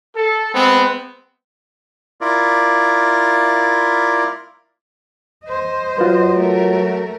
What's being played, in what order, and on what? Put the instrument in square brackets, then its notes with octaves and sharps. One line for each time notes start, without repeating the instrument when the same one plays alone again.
[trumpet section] A4
G#3 B3 C4
[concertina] E4 F4 A#4 D5
[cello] C5 D#5
[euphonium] F#3 [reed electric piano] F4 B4
[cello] A3 A#4